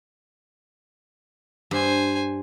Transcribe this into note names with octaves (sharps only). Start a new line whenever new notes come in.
G2 C5 G#5